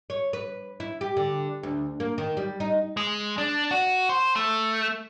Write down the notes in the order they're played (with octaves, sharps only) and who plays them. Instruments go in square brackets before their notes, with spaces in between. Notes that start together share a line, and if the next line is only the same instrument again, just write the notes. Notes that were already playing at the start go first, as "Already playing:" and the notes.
[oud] C#5
B4
E4
G4
D3
D2
A#3
D#3
G3
D#4
[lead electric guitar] G#3
D4
F#4
C5
A3